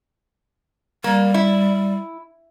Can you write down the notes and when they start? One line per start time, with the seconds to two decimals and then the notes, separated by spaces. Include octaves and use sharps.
1.04 G3 A#3
1.34 E4